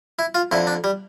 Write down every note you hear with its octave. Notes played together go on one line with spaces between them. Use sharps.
E4
F4
F2 D3 E4
D4
G3